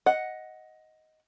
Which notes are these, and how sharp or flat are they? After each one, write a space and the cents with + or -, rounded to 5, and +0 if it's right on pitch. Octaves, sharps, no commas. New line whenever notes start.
D#5 +10 F#5 +0